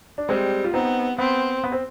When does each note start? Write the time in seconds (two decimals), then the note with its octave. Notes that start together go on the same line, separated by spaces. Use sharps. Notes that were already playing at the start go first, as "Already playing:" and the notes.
0.18 D4
0.29 G3 G#3 C4
0.64 F4
0.73 B3 C4 D#4
1.18 B3 C4
1.64 B3
1.72 C4